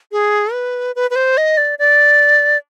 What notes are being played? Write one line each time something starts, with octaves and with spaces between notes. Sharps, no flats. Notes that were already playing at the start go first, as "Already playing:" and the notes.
G#4
B4
B4
B4
C5
D#5
D5
D5